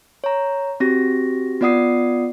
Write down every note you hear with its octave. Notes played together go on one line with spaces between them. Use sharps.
C#5 A#5
C4 F#4 G4 A#6
B3 F4 D5 F#5 D#6 C7